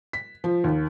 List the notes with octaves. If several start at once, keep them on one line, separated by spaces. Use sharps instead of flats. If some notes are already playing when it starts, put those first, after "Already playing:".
B6
F3
D#2